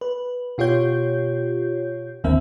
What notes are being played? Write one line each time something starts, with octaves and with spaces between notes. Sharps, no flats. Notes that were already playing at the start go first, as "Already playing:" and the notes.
B4
B2 F4 G4 C#5 G6
G1 D#2 D3 A#3 C4 E5